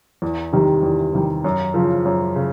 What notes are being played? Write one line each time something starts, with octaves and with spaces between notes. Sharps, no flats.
E2
C3 D#3 G3
E2
C3 D#3 G3
F#2
C#3 F3
F#2
C#3